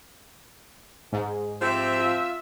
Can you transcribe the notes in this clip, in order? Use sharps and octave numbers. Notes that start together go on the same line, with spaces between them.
G#2 G#4
F3 C4 G4 E5
F4